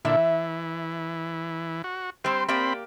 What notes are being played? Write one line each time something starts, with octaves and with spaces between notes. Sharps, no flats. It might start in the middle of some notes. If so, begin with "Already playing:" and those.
A#2 D3 E4 E5
E3
F#4
G3 C4 C5
A#3 C4 G4 D5 B5